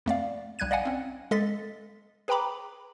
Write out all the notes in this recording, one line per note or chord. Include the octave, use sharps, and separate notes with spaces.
F2 A3 D5 F5
B1 G3 F#6 G#6 D#7
D5 D#5 F5 F#5 G#5
C4 C#4
G#3 A4 D#5 A6 B6
G#4 B4 G5 A#5 B5 D6